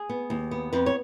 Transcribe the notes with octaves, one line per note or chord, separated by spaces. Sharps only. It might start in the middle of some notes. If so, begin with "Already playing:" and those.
Already playing: G#4
B3
D#2
B3
F2 B4
C#5